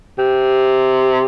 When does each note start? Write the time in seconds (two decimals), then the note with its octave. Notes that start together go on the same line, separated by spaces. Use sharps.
0.18 C3